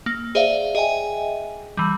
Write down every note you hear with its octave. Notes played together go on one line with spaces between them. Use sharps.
A#3
G#4 C5 D5 E5 F5
G#4 D#5 E5 G5 G#5
E3 G3